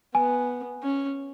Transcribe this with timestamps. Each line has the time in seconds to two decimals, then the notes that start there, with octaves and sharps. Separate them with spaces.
0.14 B3 G#5
0.83 C#4